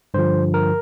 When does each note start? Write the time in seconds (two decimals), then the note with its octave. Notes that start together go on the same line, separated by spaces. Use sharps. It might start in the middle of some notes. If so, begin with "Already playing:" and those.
0.14 G2 D3 F3 C5
0.54 A#4